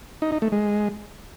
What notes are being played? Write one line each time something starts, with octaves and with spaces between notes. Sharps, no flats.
D#4
D#4
A3
G#3